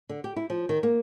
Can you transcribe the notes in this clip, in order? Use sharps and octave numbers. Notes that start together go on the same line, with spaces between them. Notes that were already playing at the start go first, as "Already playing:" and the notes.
D3
G4
E4
F3
D#3
A#3